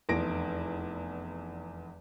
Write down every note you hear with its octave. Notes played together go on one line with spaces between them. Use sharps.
F1 E2 A#6 D7